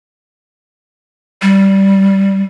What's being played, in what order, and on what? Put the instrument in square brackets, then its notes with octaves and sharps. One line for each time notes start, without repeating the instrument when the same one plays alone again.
[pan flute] G3